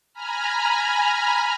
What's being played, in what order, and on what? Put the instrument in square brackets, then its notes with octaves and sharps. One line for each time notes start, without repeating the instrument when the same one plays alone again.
[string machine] G#5 A#5 B5 F6